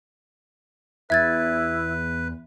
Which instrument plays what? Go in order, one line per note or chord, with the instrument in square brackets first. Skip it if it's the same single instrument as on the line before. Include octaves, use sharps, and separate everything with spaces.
[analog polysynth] E2 [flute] E4 [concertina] B4 [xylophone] E5 G#6 A6